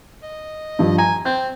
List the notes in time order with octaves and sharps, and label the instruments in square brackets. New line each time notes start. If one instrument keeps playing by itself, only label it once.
[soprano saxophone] D#5
[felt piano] G2 F3
[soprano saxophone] G#5 [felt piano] A#5
[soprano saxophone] C4 [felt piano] G6